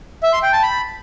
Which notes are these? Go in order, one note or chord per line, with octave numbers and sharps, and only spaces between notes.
E5
C6
G5
A5
B5